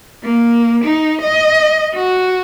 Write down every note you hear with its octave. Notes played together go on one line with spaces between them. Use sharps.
A#3
D#4
D#5
F#4